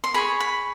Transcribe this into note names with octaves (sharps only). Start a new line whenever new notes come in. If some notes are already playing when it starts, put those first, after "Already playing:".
C6
G#4 C#5 B5
B5